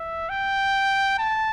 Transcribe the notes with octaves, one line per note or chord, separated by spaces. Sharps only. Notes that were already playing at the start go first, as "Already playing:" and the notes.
Already playing: E5
G5
A5